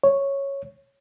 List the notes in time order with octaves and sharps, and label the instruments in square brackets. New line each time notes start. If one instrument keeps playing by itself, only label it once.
[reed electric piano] C#5